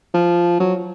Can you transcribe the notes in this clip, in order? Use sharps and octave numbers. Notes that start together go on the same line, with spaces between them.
F3
F#3